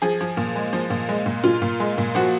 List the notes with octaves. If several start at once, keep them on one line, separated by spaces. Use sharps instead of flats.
F3 G#4
F3
A#2
G#3
F3
A#2
G#3
A#2
A#2 F4
A#2
G#3
A#2
F3 F#4